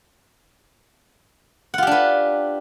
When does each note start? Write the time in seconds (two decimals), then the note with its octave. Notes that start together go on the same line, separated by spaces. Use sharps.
1.74 F#5
1.78 F4
1.83 G4
1.87 D4
1.91 B4